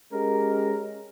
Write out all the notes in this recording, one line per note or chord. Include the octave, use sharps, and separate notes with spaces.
G#3 C#4 G4 A#4